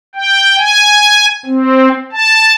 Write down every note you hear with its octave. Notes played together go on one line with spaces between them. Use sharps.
G5
G#5
C4
A5